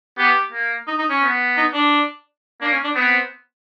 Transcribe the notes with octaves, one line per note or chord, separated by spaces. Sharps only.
B3 G4
A#3
D#4
D#4
C#4
B3
D#4
D4
A#3 D4
C#4
D4
B3 C4